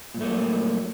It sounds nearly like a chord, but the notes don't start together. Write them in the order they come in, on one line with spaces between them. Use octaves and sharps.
A#2 G2 A3 A#3 F#3